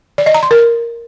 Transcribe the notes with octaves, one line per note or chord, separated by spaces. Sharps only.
D5
D#5
A#5
C6
A#4